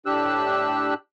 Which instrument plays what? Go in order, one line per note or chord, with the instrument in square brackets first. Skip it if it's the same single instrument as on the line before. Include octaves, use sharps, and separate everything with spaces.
[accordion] A2 D4 G4 E6 F#6